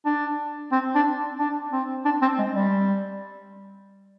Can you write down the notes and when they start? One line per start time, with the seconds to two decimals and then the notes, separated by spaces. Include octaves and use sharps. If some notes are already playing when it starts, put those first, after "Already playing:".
0.06 D4
0.72 C4
0.95 D4
1.40 D4
1.73 C4
2.05 D4
2.22 C4
2.39 G#3
2.55 G3